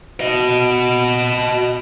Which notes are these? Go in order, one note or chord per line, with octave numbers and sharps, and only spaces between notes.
F#4 D#5